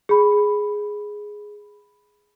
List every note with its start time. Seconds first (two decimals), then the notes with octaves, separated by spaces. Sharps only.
0.09 G#4 B5